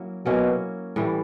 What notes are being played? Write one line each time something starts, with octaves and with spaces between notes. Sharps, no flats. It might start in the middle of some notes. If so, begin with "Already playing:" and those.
Already playing: F#3 A#3 C#4 E4
B2 F#3 A#3 C#4 E4
A2 E3 G3